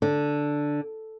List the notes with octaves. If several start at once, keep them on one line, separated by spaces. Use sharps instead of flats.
D3